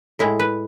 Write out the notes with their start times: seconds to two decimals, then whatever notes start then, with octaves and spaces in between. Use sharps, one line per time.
0.19 A2 G#3 E4
0.39 B4